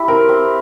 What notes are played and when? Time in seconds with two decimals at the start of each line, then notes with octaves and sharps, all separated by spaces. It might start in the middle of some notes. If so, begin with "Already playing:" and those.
Already playing: E4 G4
0.08 C4 A#4
0.29 C4